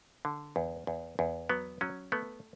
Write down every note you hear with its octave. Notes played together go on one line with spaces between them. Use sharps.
D3
E2
E2
E2
F#3 B3
F#3 C#4
A3 B3